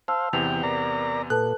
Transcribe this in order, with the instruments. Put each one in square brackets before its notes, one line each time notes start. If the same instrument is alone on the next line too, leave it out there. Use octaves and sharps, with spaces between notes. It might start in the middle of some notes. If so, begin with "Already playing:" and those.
[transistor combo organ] C5 F5 [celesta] A5 E6
[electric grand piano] E2 C3 B3 [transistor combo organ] E3 G5 [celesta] F7
[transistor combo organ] A#4 D5 A#5
[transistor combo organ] A#2 [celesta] A4 B4 A5 [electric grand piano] F#6